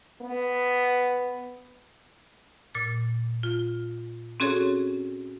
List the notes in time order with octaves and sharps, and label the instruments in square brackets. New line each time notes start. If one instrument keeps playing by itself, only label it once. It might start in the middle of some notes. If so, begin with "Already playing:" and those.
[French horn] B3
[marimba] A#2 A6
F4
C4 C#4 F#4 G#4 A4 C#5